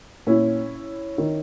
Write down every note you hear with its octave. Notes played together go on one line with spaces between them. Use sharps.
A#2 C#4 E4
D#3